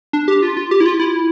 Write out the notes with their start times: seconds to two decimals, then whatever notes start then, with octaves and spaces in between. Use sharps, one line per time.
0.13 D4
0.28 G4
0.42 F4
0.57 F4
0.71 G4
0.80 E4
0.86 F4
0.99 E4